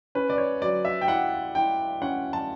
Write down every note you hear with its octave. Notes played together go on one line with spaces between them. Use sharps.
C#4 B4
D5
C#5
F#3 D5
E5
G5
E4 F#5
E4 G5
C#4 F#5
A5